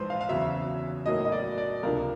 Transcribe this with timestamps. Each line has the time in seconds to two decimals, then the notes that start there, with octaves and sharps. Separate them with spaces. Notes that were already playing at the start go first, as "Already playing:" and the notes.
Already playing: A#1 G#2 E3 B4 C5
0.10 F5
0.21 F5
0.29 E2 C#3 F#3 E5
1.06 B1 A2 F#3 A#3 D#5
1.25 D#5
1.32 D5
1.58 D5
1.83 C#2 C3 F3 A#3 D4 A#4